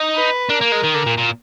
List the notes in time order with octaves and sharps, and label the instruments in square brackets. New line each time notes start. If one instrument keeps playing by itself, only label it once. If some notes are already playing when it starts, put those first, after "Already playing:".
Already playing: [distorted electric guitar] D#4
[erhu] B4
[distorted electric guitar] D4 [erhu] A#4
[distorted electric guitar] A#3
G#3
D#3
D3
A#2
A#2